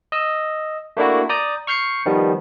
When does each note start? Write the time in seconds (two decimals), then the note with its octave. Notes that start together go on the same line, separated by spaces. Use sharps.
0.12 D#5 E6
0.97 A3 A#3 D4 E4 F#4
1.29 D5 A#5 D#6 G6
1.67 C#6 F6 G6 C7 C#7
2.06 D#3 F3 G3 B3